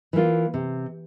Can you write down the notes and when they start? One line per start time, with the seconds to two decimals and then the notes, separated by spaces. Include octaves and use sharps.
0.13 E3 A#3 F4
0.54 C3